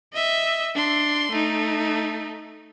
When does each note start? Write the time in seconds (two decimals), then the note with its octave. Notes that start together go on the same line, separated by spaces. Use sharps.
0.13 D#5 E5
0.75 D4 C6
1.32 A3 D#4